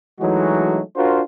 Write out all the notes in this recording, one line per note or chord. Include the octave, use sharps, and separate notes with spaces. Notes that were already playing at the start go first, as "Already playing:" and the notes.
E3 F#3 G#3 A3 D#4 F#4
D4 F4 F#4 A#4 C5